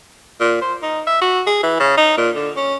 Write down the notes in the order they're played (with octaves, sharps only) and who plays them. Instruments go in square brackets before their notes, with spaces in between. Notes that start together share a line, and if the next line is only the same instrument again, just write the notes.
[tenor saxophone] A#2
C5
D#4
E5
F#4
G#4
E3
C#3
D#4
A#2
D3
C#4